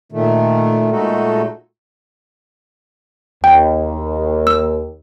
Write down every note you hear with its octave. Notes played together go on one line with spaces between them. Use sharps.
A#2 D#3 A3
A#2 G#3 A3 D#4 F#4 A4
D#2 G5
E6